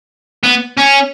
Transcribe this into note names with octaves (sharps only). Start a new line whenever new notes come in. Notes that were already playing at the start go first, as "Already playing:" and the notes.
B3
C#4